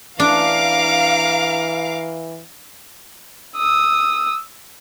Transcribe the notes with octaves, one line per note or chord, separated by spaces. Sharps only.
E3 D4 F5 A#5 D6
D#6 E6